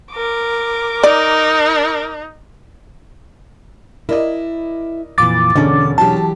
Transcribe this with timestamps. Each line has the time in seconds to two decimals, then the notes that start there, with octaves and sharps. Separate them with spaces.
0.12 A#4 D6
1.03 D#4 D5
4.09 E4 A#4 D5 D#5
5.18 F2 A#2 E3 D6 A6
5.56 E1 D3 C#4 D4
5.98 E3 F#3 G4 A5